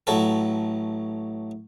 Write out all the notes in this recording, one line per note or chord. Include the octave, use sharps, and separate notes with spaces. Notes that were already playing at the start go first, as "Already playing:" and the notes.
A1 F#3 A4